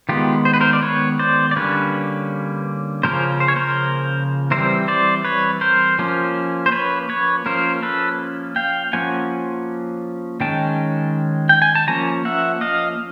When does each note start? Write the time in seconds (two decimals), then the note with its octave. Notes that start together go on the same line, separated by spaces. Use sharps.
0.09 D#3 G#3 B3 F4 G4
0.45 C5
0.54 B4
0.61 A#4 C5
0.73 D5
0.83 B4 C#5
1.19 C5 D5
1.51 D5
1.56 D3 G3 A#3 C#4 B4 C#5
3.03 C#3 F3 A#3 C#4 A#4 C5
3.40 C5
3.48 C#5
3.56 A#4 C5
4.51 E3 G3 C4 A#4 C5
4.88 C5 D5
5.25 B4 C#5
5.61 A#4 C5
5.99 F3 A#3 C#4
6.66 C5
6.72 B4 C#5
7.09 B4 C#5
7.46 F3 A#3 C#4 A#4 C5
7.82 A4 B4
8.56 F5 G5
8.93 F3 A#3 C#4 F#5 G#5
10.41 D#3 G#3 C#4 G5 A5
11.49 G5
11.62 G#5
11.75 A5
11.88 F3 A#3 C#4 G#5 A#5
12.25 E5 F#5
12.61 D#5 F5